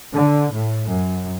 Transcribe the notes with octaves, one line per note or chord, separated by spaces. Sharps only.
D3
A2
F#2